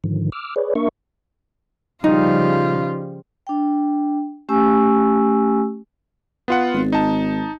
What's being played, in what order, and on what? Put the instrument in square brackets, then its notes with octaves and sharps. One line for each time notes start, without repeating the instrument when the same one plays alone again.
[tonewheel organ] G#2 D3 D#3 F3
D6 E6 F6
G#4 B4 C#5 D5
A#3 D4 A#4 E5 C#6
[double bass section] C#3 F3 G3 [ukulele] D#4 [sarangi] F4
[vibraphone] D4 G5
A3 C#4 G4 G#5 C#6 E6
[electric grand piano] B3 F4 F#5
[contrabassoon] G#1
[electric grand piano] D#4 A5